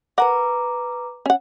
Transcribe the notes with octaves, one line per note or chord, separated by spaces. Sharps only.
A#4 B4 F#5 A#5 D6
C#4 F#5